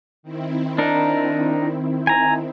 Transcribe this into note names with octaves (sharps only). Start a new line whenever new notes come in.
D#3 C4 E4
D4 D#4 A#4
G#5 A#5